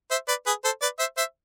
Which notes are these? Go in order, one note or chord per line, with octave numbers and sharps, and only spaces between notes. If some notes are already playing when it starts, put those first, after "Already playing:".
C5 E5
B4 D5
G#4 B4
A4 C5
B4 D5
C5 E5
C5 E5